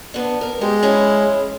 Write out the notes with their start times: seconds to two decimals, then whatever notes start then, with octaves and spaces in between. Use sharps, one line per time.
0.14 B3 D4
0.41 A#4
0.61 G#3 G4
0.83 C#4 E4 G#4